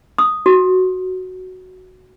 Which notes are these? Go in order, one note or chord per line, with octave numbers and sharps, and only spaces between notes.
D#6
F#4